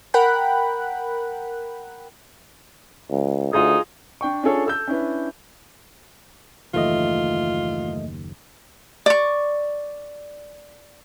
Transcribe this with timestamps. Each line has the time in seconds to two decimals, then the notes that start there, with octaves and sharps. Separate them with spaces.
0.14 A#4 F#5 G5 B5 F#6
3.10 C#2
3.53 D2 D#4 F4 G#4
4.21 D4 G5 C#6
4.43 C#4 D4 F4 G#4 A4 C#5
4.66 A4 E6 G6
4.88 C#4 D4 E4 B4
6.74 F#1 D#2 E3 A3 F4 D#5
9.06 D5 C#6